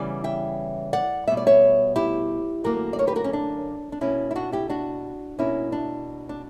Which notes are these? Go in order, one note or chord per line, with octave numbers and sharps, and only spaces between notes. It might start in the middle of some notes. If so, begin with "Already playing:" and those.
Already playing: C#3 E3 G3 B3 D5
E5 G5
D5 F#5
B2 G3 B3 E5
D5
C#5 E5
E4 G4
F#2 D3 A#3 F#4 A#4
D5
A#4 C#5
G4 B4
F#4 A#4
C#4
D4
D4
B2 A#3 C#4 E4
E4
D4 F#4
E4 G4
D4 F#4
B2 A#3 C#4 E4
D4
D4